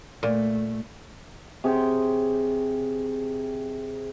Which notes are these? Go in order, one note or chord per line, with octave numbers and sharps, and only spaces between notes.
A#2 A3
C3 G#4 C#5 G5